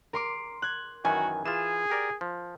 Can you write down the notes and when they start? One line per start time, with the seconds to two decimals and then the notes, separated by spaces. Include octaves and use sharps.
0.13 A#4 C6 D6
0.62 F#6 G#6
1.05 F#2 D#3 E3 F#4 G#5
1.45 E3 F4 G#4 E7
1.90 G4 A#4 D5
2.21 F3